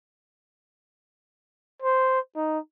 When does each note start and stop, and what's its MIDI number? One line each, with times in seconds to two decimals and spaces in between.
1.82 2.19 72
2.36 2.59 63